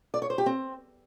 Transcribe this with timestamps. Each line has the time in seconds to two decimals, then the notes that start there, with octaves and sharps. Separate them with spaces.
0.14 D5
0.22 C#5
0.30 C5
0.38 G4
0.46 C4